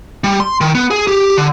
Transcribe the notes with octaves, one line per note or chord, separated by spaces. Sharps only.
G3
C6
D#3
B3
G#4
G4
D3